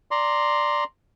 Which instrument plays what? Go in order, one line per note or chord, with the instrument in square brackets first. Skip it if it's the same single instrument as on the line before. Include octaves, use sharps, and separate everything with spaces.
[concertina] D5 A#5 C6